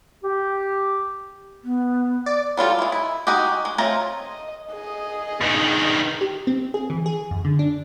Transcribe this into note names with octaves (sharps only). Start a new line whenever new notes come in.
G4
B3
D5
F#3 G3 F4 A4
G#3 E4
E4
G#3 D#4 F#4 G4
G#3
A3 C4 F4 C#5 A#5
D#5
G#4 D#5
G2 D#3
G4
C4
G#4
E3
G#4
F#2
D3
D4